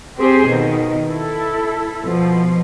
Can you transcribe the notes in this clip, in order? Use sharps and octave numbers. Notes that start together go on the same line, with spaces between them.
C4 G4 G#4 C5
B2 D#3
E4 A4
B2 F3